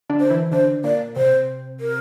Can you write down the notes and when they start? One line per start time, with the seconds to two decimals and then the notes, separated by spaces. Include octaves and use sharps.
0.09 D3 D4
0.20 C5
0.30 E3 E4
0.52 D3 D4 C5
0.84 A#2 A#3 D5
1.16 C3 C4 C5
1.80 A#4